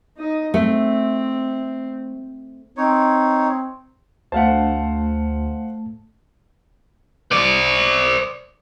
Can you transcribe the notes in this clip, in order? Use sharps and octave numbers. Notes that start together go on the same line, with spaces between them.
D#4 D#5
A3 C4
C4 D#4 C#5
D2 A3 C5 F5 F#5 A5
C5 D5